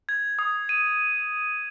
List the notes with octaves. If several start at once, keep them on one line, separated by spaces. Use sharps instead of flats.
G#6
D#6
D#7